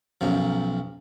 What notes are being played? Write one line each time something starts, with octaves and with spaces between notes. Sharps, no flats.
B1 F#2 F3